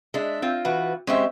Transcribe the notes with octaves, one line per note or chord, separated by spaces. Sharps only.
G#3 D4 E5
C4 F4
E3 F#4 B4
G#3 C4 C#4 G4 E5